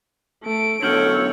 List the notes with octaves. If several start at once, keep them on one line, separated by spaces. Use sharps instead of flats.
A3 D7
F#2 B2 D3 A4 C#5 F6 G6 F#7